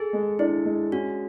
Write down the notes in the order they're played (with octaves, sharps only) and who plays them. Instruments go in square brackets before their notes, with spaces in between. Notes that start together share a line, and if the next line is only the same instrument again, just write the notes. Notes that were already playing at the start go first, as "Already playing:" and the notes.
Already playing: [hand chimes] G#4 [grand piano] A4
[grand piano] G#3
[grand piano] D4 [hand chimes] E4
[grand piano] G#3
[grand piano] C#4 [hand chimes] F#4